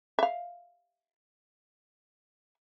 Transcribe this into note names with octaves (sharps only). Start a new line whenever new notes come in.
E5 F5